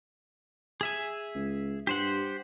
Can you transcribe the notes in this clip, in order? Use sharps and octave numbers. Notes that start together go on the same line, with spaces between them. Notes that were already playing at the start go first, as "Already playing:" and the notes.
G#4 E5 G#5
C#2
G2 G4 C5 F#5